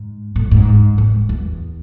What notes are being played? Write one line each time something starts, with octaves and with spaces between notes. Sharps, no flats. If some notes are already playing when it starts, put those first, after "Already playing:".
Already playing: G#2
A2
G#2
G#2
E2